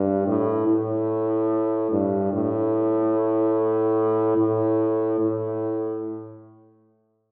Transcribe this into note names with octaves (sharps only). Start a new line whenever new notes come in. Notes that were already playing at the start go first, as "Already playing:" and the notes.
Already playing: G2
A2
A2
G2
A2
A2
A2